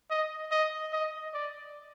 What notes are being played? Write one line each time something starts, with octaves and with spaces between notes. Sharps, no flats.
D#5
D#5
D#5
D5